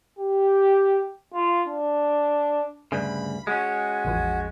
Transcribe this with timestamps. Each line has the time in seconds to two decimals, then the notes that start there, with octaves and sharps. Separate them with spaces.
0.19 G4
1.33 F4
1.68 D4
2.92 D2 G2 C#3 B5
3.47 G#3 C#4 F#4
4.05 A1 E2 F3